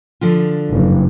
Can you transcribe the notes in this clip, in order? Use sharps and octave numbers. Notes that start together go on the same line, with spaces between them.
D3 F3 F4
F#1 G2